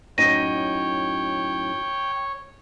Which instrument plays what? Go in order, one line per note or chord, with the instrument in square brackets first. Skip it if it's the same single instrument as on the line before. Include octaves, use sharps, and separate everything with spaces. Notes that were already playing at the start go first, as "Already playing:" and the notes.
[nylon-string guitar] F#2 A2 D#4 [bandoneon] C#5 [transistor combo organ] G5 [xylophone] A#6 D#7